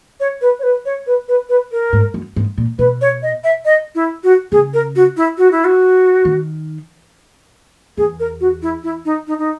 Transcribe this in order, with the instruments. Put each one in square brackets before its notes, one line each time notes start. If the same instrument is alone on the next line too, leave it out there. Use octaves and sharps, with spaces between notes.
[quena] C#5
B4
C#5
B4
C#5
B4
B4
B4
A#4
[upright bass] G#2
F#2
G#2
A#2
[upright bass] B2 [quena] B4
[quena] C#5
D#5
E5
D#5
E4
F#4
[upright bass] C#3 [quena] G#4
[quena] A#4
F#4
E4
F#4
E4
F#4
[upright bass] D#3
[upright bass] E2 [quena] G#4
[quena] A#4
F#4
E4
E4
D#4
D#4
D#4